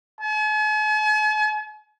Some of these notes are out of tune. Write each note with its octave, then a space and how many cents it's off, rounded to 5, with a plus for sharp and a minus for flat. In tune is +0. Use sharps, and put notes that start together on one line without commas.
G#5 +45